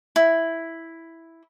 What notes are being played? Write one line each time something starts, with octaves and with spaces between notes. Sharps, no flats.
E4